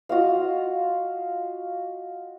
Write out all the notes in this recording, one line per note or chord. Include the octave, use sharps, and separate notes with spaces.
F4 F#4 D#5 F5